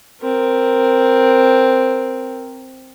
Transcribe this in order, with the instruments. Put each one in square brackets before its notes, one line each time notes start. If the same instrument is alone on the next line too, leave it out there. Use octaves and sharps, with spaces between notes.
[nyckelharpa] C4 A#4